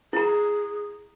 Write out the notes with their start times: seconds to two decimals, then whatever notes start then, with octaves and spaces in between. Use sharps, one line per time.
0.13 E4 G#4 A#5